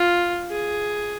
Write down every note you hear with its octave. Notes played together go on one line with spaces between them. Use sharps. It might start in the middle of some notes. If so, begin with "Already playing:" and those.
Already playing: F4
G#4